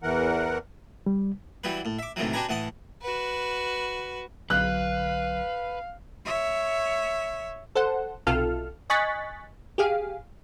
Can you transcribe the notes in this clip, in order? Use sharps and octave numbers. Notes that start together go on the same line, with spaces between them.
E2 E3 A#4 F#5
G3
E3 F#3 G3 B4
A2
E5 D6
A2 C3 D#3 E3 F#3
D4 F#4 G4 B4 G#5 A#5
A2 E3 F#5 A5 D#6
F#4 B4
B1 D3 F#3 B4 F5 F#6
C#5 E5
A4 C5 F#5
B1 C3 F4 A4 F6
D#5 G#5 C#6 F#6 A6 B6
G4 G#4 F5